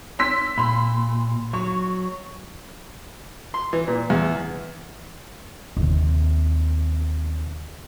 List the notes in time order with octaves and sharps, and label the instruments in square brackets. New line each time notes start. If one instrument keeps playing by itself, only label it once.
[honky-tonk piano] C6 E6 B6
[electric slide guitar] A#2 [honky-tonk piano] B5 C6
[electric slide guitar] F#3 [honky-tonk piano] C#6
[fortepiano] C6
E3
A#2
E2
[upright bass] D#2 C3